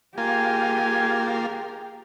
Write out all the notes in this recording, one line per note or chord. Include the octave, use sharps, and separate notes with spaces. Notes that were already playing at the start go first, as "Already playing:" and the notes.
A#3 F4 G4 G#4 G#5